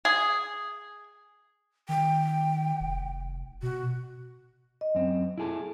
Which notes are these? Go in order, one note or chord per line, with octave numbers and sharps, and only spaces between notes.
G#4
D#3 G5
F1
B2 F#4
D#5
F#2 C4
E4 G#4 A4